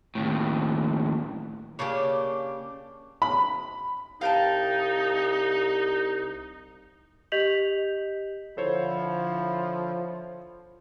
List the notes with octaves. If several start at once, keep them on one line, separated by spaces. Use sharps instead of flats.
D#2 A2
C#3 A#3 D4 G4
B5
C2 D#4 F5 G5 A5
G4 D#5 G6 B6 F7 F#7
D3 F3 E4 A4 C5 C#5